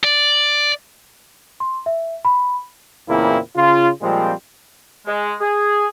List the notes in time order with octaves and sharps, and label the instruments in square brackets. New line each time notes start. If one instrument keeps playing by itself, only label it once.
[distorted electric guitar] D5
[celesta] C6
E5
B5
[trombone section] E2 A#2 C#3 A#3 C4 E4
C#3 F4
A#2 F3 G3 G#3 C4
[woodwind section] G#3
G#4